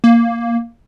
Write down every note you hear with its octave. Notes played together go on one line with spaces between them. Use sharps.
A#3